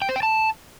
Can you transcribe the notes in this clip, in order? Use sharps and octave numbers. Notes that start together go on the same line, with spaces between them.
G5
C5
G5
A5